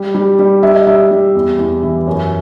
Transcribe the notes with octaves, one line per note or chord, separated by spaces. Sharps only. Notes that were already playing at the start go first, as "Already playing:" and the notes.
Already playing: G3
G3
G3
G3 E5
D#5
G3 E5
G3
E2
E2
E3
F#2